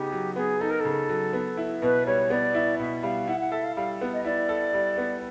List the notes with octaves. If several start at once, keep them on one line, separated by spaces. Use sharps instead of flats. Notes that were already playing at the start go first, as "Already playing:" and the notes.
Already playing: C#3 B3 D#4 G4
F#3
B3 G#4
D#4 A4
A#4
C#3 A4
F#3
B3
E4
B2 B4
G3 C#5
B3 D5
E4
B2 E5
G3 F5
E4 F#5
F#5
A4 E5
F5
G3 F5
B3
D#5
E4 D5
A4
G3
B3